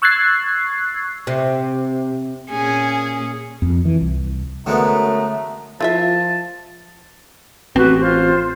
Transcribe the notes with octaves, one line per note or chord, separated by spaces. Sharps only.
C#6 E6 F#6 G#6 A6 C7
C3
A#2 C#4 G#4 G#5
F2
E3
C2
F#2 D3 G#3 A3 B3 A#5
F3 E4 F4 A#4 E5 A5
A1 C4 F#4 G4 B4
F4 C5